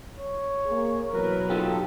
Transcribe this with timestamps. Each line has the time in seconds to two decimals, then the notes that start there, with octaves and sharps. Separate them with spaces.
0.18 C#5
0.66 A#3 G#4
1.12 B2 E3 F#3 A#4 B4
1.50 D#4 F4 G4 A4